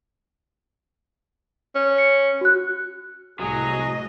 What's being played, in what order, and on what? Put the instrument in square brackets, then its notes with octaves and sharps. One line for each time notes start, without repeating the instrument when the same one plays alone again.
[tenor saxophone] C#4
[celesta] C#7
F#4 F#6
[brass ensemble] C2 [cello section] A2 D#5 [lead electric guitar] F#3 [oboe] G#4